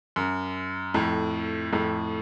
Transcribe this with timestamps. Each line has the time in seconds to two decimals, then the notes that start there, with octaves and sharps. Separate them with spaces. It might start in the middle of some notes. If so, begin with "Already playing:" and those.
0.16 F#2
0.94 F2 A2
1.72 F2 A2